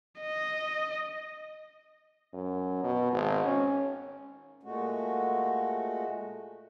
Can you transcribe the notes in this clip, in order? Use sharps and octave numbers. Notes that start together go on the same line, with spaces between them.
D#5
F#2
B2
G#1
C#4
A#2 G#3 A3 F#4